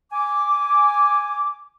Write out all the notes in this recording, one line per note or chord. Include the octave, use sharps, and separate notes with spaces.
G#5 D6